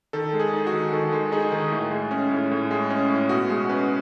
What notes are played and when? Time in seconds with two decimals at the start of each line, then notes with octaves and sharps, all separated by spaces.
0.13 D#3 A4
0.33 G#3
0.40 G#4
0.53 D#4
0.67 F#4
0.72 D#3
0.93 D#3 A4
1.12 G#3
1.32 D#4 G#4
1.52 D#3
1.72 A2
1.91 G#3
2.11 C#4
2.31 A2
2.51 A2
2.71 G#3
2.90 C#4
3.10 A2
3.29 B2 F#4
3.50 G#3
3.69 C#4 B4